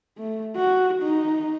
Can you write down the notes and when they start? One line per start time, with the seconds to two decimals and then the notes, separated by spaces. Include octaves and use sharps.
0.18 A3
0.56 F#4
1.02 D#4